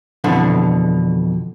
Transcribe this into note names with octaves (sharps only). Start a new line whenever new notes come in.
F2 B2 D3 E3 D4